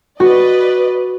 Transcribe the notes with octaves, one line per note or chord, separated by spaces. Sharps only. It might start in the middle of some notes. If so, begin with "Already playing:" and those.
F#4 B4 D5 D#5